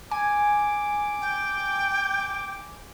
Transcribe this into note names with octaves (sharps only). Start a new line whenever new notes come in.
G#5 D6
G5